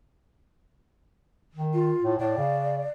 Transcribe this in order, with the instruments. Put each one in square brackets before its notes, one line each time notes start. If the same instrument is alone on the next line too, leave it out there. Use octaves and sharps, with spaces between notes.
[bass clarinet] D#3
[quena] F4
[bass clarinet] A2
[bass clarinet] A2 [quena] D5
[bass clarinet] C#3